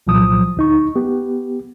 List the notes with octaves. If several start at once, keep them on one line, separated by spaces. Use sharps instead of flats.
C2 A#2 F3 F#3 D#6
D2 D#4 C#6
B3 G4